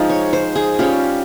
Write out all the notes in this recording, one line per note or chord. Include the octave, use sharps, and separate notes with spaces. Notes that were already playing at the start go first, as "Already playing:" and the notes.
Already playing: F3 G#3 D#4
C#5
C5
G#4
G3 C#4 F4 G4